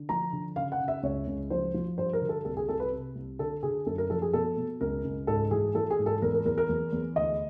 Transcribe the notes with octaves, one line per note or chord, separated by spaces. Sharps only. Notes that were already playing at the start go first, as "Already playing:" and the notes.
Already playing: D3
F3 A#5
D3
C#3 F5
F#5
C#3
E5
C#2 C#5
C#2
F3 C5
F3
G2 C5
A#4
D3
A4
C2 A4
G#4
C2 A4
B4
C3
C2
D3 A4
D3 G#4
F#2 A4
A#4
F3 A4
G#4
B2 A4
B2
C#2 A#4
C#2
G#2 A4
E3 G#4
E3 A4
G#4
G#2
A4
E2 A#4
A#4
E2 A#4
A#4
E2
E2
D2 D#5